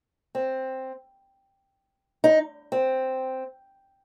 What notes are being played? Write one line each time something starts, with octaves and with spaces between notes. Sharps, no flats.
C4
D#4
C4